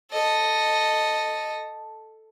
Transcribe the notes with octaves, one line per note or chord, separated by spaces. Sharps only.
A4 D#5